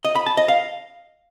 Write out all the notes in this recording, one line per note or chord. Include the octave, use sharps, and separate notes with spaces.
D#5
B5
A5
D#5
F5